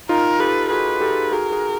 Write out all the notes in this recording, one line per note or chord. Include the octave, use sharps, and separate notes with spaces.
D#4 F4 A#4
G4 A4 B4
F#4 G#4 B4
G4 A4
F#4 G#4 A#4
F#4 G#4